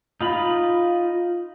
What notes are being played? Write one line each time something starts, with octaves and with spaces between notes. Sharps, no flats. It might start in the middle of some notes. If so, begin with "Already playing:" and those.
D#4 F4 B5